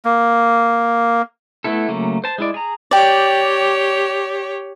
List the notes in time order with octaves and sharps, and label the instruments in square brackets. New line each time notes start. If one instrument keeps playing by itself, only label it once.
[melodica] A#3
[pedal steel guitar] A3 B3 E4 A4
C#3 F#3 A3 A#3
C5 A5
G#3 E4 D5
G#4 A#5
[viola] G4 C#5 [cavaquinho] D5 G5